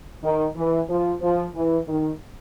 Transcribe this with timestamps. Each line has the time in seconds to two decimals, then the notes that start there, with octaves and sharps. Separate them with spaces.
0.23 D#3
0.57 E3
0.89 F3
1.21 F3
1.55 E3
1.88 D#3